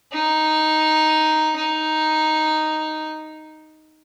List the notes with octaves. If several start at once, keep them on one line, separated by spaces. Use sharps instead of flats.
D#4
D#4